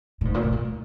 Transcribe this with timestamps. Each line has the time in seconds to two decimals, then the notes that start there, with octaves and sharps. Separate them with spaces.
0.21 A#2
0.25 G#2
0.34 A#2
0.43 B2
0.52 A#2